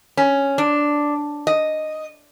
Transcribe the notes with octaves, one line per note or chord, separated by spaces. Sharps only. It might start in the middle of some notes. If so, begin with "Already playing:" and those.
C#4
D4
D#5